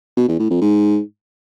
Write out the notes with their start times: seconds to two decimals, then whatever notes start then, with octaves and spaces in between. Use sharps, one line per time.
0.17 B2
0.28 E2
0.39 A2
0.50 F2
0.61 G#2